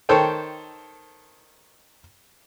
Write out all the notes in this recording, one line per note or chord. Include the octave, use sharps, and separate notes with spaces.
D#3 A4 C5 C#5 G5